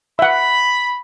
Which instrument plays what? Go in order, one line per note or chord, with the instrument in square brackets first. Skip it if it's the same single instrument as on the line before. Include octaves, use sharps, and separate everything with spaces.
[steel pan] E5 F#5 [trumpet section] B5